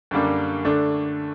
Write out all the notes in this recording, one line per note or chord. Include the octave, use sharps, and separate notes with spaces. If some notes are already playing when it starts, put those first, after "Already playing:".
F#2 D3 G3 A#3 D4
D3 A3 D4